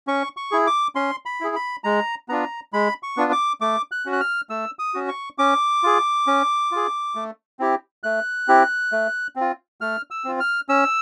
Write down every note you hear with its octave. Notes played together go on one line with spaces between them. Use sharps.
C#4 C#6
C#6
E4 G#4
D6
C#4 C6
B5
E4 G#4
B5
G#3 A#5
B3 D4 F4 A#5
G#3 B5
C#6
B3 D4 F4
D6
A3 D6
F#6
C#4 F#4
F#6
F6
A3 E6
D#6
C#4 F#4
C#6
C#4 D6
F4 G#4
C#4
F4 G#4
A3
C4 E4 G4
A3 F#6
C4 E4 G4
A3
C4 F4
A3 F6
E6
C4 F4
F6
C#4 E6